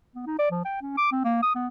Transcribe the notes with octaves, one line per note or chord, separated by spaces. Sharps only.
B3
D#4
D5
F3
G5
C#4
D6
C4
A#3
D#6
B3